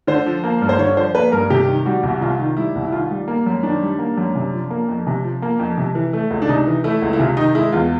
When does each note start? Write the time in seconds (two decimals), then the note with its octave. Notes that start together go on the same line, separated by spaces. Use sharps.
0.07 D3 C5
0.26 F3
0.44 A#3
0.61 G2
0.69 C5
0.79 D3 C#5
0.97 F3 C5
1.15 A#3 B4
1.32 G2 A#4
1.50 C3 G4
1.68 D#3
1.86 G3 F#4
2.03 C2
2.21 C3 F4
2.39 D#3
2.57 G3 E4
2.75 C2
2.85 E4
2.92 D#3 F4
3.10 G3
3.28 A#3
3.46 F#2
3.63 D#3 D4
3.82 G3
3.99 A#3
4.18 F#2
4.35 C3
4.53 F3
4.70 A#3
4.88 F2
5.07 C3
5.24 F3
5.42 A#3
5.59 F2
5.78 C3
5.95 E3
6.13 A3
6.31 C#2
6.42 D4
6.49 C3 D#4
6.67 E3
6.84 A3 E4
7.02 C#2
7.13 E4
7.20 C3 F4
7.37 D#3 D#4
7.55 G#3 E4
7.72 E2 F4